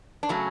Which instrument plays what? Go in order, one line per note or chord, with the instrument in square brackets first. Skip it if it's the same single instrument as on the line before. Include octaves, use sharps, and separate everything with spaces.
[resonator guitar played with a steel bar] D4
C#3 F#3 A3 C#4